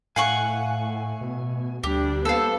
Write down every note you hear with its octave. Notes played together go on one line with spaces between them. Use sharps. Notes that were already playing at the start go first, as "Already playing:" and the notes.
A2 A3 F5 F#5 G#5 C#6
B2
D2 G3 D4 G4
A#3 B3 A4 C5 F5